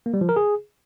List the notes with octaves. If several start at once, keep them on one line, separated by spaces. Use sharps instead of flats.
A#3
G3
F3
A#4
G#4